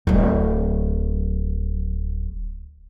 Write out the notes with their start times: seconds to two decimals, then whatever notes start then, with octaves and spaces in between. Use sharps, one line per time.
0.07 D1 F#3